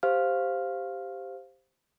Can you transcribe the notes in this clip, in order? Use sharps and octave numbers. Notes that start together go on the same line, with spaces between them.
G4 C5 F5 F6